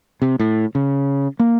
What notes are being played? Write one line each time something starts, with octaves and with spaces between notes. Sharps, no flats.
C3
A2
C#3
A#3